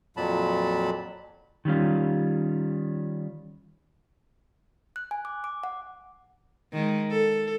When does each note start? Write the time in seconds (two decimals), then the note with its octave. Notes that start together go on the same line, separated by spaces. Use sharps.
0.17 F2 A#2 F#3 A5 B5
1.65 D#3 G3 C#4 F4
4.96 F#6
5.11 G#5
5.25 D6
5.44 D6
5.64 F#5
6.72 D#3 G#3
7.11 A4